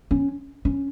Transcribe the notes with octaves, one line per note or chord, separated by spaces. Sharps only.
C#4
C#4